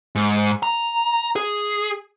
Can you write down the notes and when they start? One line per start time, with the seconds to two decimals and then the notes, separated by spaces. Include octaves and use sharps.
0.15 G#2
0.63 A#5
1.36 G#4